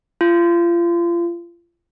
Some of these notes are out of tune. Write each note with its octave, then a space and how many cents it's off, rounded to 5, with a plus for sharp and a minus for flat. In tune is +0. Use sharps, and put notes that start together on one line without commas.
F4 -30